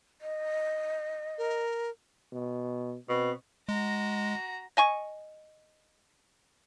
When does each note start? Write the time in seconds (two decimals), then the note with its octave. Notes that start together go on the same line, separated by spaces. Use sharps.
0.22 D#5
1.38 A#4
2.32 B2
3.09 B2 C4
3.69 G#3 F#4 A#5
4.77 D#5 G#5 C#6